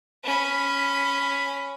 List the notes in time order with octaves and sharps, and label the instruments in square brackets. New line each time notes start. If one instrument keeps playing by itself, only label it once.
[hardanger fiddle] C#4 B5